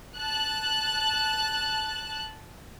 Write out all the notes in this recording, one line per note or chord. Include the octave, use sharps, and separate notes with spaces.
A5 F#6